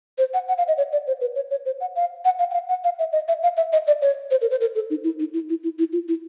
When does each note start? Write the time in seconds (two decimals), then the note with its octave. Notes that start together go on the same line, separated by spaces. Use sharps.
0.18 C5
0.34 F#5
0.48 F#5
0.58 F5
0.68 D#5
0.78 C#5
0.92 D5
1.07 C5
1.21 B4
1.36 C#5
1.51 C#5
1.66 C5
1.81 F#5
1.96 F5
2.25 F#5
2.39 F5
2.51 F#5
2.54 F5
2.69 F#5
2.84 F5
2.99 E5
3.13 D#5
3.28 E5
3.43 F5
3.57 E5
3.73 D#5
3.87 D5
4.02 C#5
4.31 C5
4.41 A#4
4.51 C5
4.61 A#4
4.75 A4
4.90 D#4
5.04 E4
5.19 D#4
5.34 E4
5.49 E4
5.63 E4
5.79 E4
5.92 F4
6.08 E4